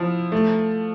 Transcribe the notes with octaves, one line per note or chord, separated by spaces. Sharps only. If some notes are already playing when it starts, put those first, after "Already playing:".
Already playing: F3 E4
A3